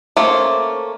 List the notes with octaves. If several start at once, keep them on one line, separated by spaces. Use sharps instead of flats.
A3 A#3 C#4 C5